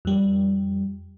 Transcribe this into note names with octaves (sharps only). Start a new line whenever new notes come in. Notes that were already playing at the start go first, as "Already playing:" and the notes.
F2 G3